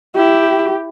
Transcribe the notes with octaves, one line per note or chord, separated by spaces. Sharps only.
E4 G4